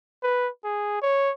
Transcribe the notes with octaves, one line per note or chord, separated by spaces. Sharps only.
B4
G#4
C#5